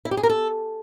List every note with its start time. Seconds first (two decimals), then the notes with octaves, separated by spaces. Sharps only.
0.05 E4
0.11 G4
0.17 G#4
0.23 A#4
0.29 A4